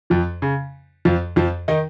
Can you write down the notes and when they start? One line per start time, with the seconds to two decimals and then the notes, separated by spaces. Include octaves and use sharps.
0.10 F2 F3
0.42 C#3
1.05 F2 F3
1.36 F2 F3
1.68 D#3 D#4